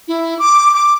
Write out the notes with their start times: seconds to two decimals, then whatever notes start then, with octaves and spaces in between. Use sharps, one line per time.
0.08 E4
0.39 D6
0.74 D6